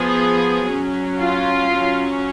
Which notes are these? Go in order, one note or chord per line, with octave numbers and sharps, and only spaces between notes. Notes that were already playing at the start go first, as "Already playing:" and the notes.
Already playing: F3 B3 G#4
F#3 C#4
F4
F#3 C#4